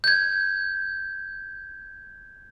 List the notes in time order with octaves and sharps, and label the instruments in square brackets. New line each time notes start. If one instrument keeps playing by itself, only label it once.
[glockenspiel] G6 G#6